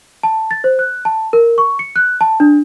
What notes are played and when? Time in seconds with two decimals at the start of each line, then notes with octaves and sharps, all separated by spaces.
0.23 A5
0.51 A6
0.64 C5
0.79 F#6
1.05 A5
1.33 A#4
1.58 C#6
1.79 C#7
1.96 F#6
2.21 A5
2.40 D4